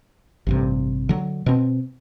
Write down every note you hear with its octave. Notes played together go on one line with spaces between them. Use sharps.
A1 G2 C3
D3 F#3
B2 C4